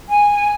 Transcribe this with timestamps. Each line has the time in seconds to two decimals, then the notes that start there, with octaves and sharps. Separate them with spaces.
0.09 G#5